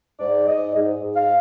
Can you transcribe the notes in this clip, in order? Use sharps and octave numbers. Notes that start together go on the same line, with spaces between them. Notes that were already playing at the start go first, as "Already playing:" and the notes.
G#2 D5
G#2 D#5
G#2
G#2
F5